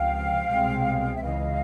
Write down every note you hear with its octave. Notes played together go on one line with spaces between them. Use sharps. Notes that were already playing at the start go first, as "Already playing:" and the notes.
Already playing: C#2 C3 F3 F5 G5
C2 B2 G#3 C4
E5
C#2 C#3 E3 D#5 F5